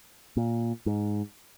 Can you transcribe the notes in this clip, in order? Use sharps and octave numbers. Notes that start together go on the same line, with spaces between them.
A#2
G#2